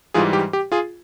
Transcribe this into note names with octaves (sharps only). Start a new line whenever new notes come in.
G#2 E3 G3 F4 G#4
G4
G4
F4 G#4